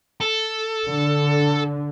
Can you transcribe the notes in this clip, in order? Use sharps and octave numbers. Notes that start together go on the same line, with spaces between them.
A4
D3